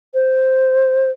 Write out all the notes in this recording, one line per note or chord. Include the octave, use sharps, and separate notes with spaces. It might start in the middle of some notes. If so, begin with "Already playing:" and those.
C5